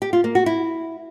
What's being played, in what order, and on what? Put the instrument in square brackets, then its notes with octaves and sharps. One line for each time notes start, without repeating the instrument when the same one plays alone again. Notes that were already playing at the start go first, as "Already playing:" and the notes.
[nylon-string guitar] G4
F4
A#3
F#4
E4